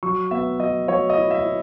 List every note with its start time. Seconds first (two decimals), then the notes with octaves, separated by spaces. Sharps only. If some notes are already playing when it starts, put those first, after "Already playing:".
0.03 F#3 C#6
0.31 B3 E5
0.59 F#3 D#5
0.88 F#3 C#5
1.10 D#5
1.17 E4
1.31 E5
1.45 E4